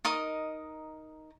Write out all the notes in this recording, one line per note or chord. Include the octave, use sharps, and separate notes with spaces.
D#4 A#4 D#5 D#6